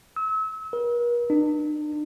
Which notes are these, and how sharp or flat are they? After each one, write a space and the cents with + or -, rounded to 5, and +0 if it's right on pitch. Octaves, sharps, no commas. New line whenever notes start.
E6 -35
A#4 +45
D4 +45